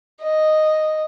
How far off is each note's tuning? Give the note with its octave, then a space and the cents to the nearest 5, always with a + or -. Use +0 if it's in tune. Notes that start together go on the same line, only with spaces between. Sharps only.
D#5 -5